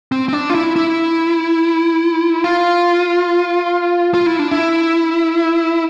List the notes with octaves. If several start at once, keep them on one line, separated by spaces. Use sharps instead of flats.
C4
C4
D4
F4
E4
E4
F4
F4
E4
D4
E4